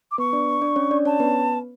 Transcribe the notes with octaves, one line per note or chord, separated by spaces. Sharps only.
D6
B3 B4 C#6
D4 D5
D4 D5
C#4 C#5
D4 D5
C#4 C#5 A5
B3 B4